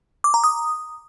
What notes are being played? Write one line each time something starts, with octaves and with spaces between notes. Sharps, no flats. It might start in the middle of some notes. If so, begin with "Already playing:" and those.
D6
A#5
D#6